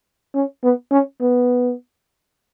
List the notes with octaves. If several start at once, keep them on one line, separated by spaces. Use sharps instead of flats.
C#4
B3
C#4
B3